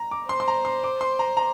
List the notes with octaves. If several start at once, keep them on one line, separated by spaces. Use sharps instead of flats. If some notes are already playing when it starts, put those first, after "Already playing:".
Already playing: A#5
D6
C5 C6
C6
A#5
C6
D6
C6
A#5
A#5